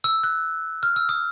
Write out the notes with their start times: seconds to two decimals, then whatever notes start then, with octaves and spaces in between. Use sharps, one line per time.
0.04 E6
0.24 F#6
0.83 F6
0.96 E6
1.09 D#6